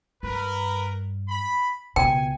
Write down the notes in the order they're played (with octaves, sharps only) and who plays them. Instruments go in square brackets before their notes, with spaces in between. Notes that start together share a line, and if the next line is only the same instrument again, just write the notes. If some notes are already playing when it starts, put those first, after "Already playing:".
[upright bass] G2 [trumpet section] A#4 B4
[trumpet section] B5
[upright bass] C#2 B2 [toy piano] G5 [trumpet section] G#5